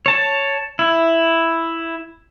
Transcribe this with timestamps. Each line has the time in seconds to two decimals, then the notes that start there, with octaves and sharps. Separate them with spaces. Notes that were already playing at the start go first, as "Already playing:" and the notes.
0.06 C#5 A5
0.79 E4